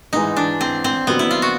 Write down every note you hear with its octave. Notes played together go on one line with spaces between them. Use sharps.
G#2 E3 G#3 D#4
D4
C4
C4
F2 D3 F#3 A#3 B3
E4
F4
F#4